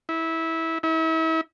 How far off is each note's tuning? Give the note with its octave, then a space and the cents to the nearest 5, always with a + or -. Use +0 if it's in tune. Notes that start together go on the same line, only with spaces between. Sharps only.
E4 -15
E4 -35